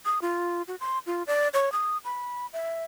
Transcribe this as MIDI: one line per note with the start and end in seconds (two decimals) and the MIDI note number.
0.05 0.21 87
0.22 0.62 65
0.68 0.76 66
0.80 0.99 84
1.06 1.23 65
1.27 1.48 74
1.54 1.72 73
1.72 1.98 87
2.05 2.46 83
2.53 2.84 76